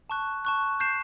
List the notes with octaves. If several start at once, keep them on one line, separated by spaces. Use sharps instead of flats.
A5 C#6 F#6
A5 C#6 F#6
G6 C7 E7